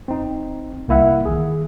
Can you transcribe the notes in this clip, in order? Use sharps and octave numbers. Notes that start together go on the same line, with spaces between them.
C4 D#4
C2 A#3 E4 E5 F#5
D#3 G#4